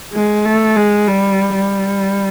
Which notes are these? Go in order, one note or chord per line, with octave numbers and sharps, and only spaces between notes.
G#3
A3
G#3
G3
G3